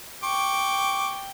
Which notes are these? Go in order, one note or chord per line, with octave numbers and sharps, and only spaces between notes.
G5 C#6 D6